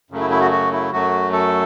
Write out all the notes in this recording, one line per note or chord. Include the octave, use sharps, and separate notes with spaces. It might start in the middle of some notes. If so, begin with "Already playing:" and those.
F#2 C#3 F#3 A3
E4
E4
F#4
F#4
E4
F#2 F#3 A3 F#4
A4